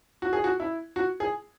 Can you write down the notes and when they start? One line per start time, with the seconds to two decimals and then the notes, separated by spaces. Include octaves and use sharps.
0.22 F#4
0.33 G#4
0.44 F#4
0.60 E4
0.96 F#4
1.20 G#4